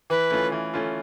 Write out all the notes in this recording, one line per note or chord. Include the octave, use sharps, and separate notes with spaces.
E3 B4
A3 C#4 F4
E3
A3 C#4 F4